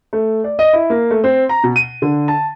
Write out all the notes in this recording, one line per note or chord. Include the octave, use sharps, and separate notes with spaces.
A3
D5
D#5
E4
A#3
A3
C4
A#5
B2
D#7
D3
A5